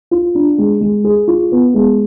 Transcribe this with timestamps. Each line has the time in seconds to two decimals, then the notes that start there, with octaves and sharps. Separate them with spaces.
0.11 F4
0.35 D4
0.58 G#3
0.81 G#3
1.04 G#4
1.28 F4
1.52 B3
1.74 G#3